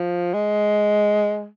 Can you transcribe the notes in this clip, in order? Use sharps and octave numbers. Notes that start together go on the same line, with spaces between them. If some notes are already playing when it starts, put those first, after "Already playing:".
Already playing: F3
G#3